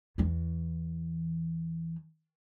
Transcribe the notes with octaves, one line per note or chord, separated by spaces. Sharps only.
E2 E3